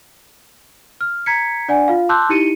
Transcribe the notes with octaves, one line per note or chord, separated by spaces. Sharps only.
F6
A#5 G#6 B6 C#7
D4 D5 F#5 G#5
F4 F5
A5 C6 D6 E6 F#6 G6
D#4 E4 G4 C#7 D#7